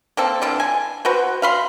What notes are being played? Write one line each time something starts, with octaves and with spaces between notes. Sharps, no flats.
A#3 C4 A4
D3 E3 F4
G#5
F#4 B4 C5
F5 B5 C6